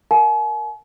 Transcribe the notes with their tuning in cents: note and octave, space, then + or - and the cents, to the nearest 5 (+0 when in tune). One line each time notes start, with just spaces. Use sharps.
A#4 +0 F5 +35 G#5 +45